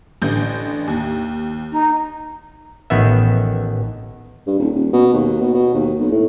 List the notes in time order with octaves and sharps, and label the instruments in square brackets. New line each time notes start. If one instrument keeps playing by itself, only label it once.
[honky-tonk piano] A1 D3 G6
D#2
[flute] D#4
[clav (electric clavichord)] A1 D#3 B3 E5
[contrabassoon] G2
D#1
D#1
B2
D#2
B2
B2
D#2
B1
A2